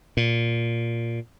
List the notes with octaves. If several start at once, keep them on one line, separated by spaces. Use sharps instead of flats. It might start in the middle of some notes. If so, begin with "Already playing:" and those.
A#2